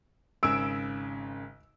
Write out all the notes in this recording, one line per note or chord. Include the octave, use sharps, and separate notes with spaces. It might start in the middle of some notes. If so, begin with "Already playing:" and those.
G#1 C#3 G#5 E6 D7